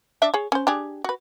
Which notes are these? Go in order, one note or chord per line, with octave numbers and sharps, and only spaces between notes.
D4 D5 E5
G#4 C#5
C#4 C5
D4 G4 G#4
F#4 B4